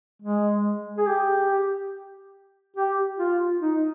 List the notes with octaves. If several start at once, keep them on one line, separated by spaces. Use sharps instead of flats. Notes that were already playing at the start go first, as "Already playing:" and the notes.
G#3
G#4
G4
G4
F4
D#4